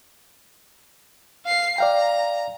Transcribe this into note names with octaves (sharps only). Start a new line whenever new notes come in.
F5 C7
D5 F5 G5 A#5